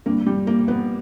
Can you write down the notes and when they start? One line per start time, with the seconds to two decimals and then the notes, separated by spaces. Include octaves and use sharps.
0.06 G2 D3 G3 A#3
0.27 G3
0.47 A#3
0.68 B3